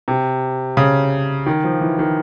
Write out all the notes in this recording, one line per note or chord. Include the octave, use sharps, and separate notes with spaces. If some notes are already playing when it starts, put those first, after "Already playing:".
C3
C#3
D#3
F3
E3
D#3